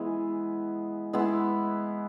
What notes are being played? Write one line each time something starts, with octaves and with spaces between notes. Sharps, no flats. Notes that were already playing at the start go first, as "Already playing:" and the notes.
Already playing: E3 G#3 B3 E4
G#3 B3 E4